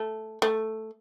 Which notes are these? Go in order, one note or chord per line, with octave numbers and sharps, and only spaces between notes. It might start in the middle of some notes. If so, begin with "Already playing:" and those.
Already playing: A3
A3